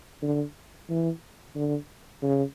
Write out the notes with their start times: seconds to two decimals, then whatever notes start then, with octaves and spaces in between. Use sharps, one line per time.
0.22 D3
0.89 E3
1.55 D3
2.22 C#3